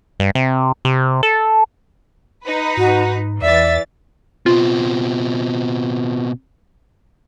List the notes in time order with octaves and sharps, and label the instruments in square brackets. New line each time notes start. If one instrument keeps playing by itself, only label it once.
[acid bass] G2
C3
C3
A4
[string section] D#4 B4
[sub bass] G#2 [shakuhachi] F#4
[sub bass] E2 [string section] E3 A6 [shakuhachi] D5 [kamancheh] E5
[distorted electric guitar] B2 C4 [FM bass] F4